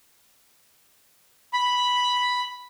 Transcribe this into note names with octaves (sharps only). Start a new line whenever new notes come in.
B5